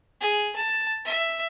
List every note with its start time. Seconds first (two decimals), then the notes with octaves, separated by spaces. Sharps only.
0.21 G#4
0.56 A5
1.05 E5